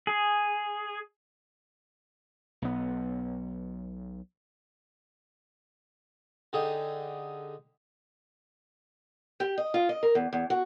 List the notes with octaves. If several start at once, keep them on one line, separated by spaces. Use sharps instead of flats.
G#4
B1 B3
D3 D#4 G4 G#4
G4
D#5
F4
D#5
A#4
E2
E2
F#4